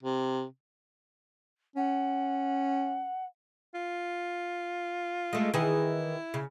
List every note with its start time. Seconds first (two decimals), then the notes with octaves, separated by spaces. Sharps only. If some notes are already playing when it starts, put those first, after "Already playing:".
0.03 C3
1.76 C#4 F#5
3.74 F4
5.33 G#3 A3
5.54 D#3 E3 E4 G#4
6.34 C#3